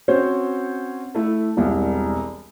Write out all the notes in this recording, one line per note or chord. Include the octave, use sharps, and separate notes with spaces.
C4 C#4 F#4 C5 C#5
A3 E4
E1 C2